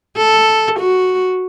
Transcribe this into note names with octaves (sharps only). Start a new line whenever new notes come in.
A4
F#4